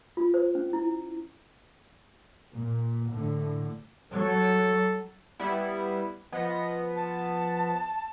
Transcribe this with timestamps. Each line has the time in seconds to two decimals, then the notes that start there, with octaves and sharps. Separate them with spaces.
0.17 F4
0.34 C5
0.55 C#4
0.73 E4
2.55 A#2
3.10 A2 D3
4.12 F#3 A4
5.39 G3 B3 E4
6.32 F3 B3 D#5
6.96 A5